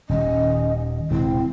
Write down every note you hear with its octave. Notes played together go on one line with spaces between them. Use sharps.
D#1 D#3 G3 C#4 D#5
D#1 C3 G#3 C4 E4